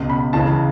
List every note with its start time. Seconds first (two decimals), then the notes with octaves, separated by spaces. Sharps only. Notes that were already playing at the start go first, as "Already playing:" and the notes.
Already playing: C#2 B2
0.10 B5
0.33 C#2 C#3 E3 A5